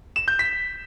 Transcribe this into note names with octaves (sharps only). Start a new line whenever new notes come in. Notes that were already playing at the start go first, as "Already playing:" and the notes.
E7
G6
B6